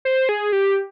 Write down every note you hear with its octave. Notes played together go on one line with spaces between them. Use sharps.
C5
G#4
G4